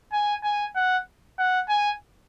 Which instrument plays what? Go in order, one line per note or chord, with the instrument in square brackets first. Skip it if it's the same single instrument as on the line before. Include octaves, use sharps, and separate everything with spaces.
[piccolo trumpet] G#5
G#5
F#5
F#5
G#5